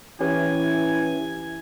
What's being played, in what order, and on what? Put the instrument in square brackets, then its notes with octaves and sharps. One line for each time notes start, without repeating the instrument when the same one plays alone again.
[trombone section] E3 [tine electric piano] C#4 G4 B4 [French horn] E4 [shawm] G#5